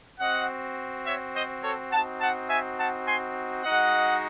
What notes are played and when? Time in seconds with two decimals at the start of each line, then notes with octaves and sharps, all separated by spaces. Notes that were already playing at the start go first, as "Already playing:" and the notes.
0.20 C4 F#4 D#5 F#5
1.06 C#5 E5
1.35 C5 D#5
1.63 A4 C#5
1.92 C4 D#4 F#4 F#5 A5
2.21 F#5 A5
2.50 E5 G#5
2.79 F#5 A5
3.07 G#5 C6
3.64 G#3 D#4 F#4 D#5 F#5